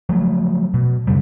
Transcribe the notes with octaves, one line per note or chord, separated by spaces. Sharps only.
F3 F#3 A3
B2
F#2 C#3 G3